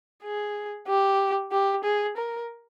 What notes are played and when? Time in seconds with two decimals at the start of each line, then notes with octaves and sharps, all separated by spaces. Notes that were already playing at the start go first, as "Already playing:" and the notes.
0.23 G#4
0.88 G4
1.52 G4
1.84 G#4
2.17 A#4